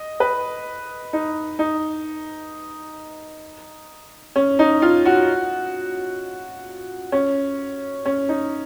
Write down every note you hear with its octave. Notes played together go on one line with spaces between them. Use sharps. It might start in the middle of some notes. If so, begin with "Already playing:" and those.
Already playing: D#5
B4
D#4
D#4
C#4
D#4
F4
F#4
C#4
C#4
D#4